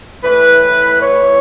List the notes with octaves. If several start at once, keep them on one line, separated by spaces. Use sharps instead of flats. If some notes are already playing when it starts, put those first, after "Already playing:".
A2 E3 B4
C#5